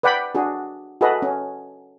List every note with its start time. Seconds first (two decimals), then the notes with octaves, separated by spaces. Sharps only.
0.03 B4 D5 F#5 G5 B5
0.35 D4 F#4 G#4
1.01 F#4 G#4 A4 B4 D#5
1.22 C#4